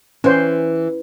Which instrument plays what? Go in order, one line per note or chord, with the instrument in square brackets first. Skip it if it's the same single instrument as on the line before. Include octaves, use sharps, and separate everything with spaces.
[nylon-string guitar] E3 [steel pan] C#4 C5